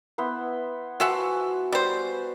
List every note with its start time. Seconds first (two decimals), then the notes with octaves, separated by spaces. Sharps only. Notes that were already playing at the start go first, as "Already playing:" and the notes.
0.18 B3 E4 C5
1.00 F3 F#4 E5 F#5 G#5
1.72 G3 B4 C5